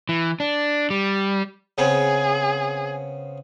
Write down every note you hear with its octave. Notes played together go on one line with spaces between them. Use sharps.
E3
D4
G3
C#3 B3 C4 G#4